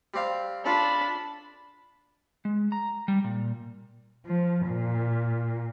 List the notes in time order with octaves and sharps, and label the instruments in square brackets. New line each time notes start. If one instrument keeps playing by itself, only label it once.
[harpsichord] G3 C4 F5
[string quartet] D4 [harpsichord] F4 A4 [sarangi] B5
[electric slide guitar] G#3
A#5
G3
A#2
[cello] F3
A#2